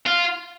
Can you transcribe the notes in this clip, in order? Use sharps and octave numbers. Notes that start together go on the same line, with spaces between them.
F4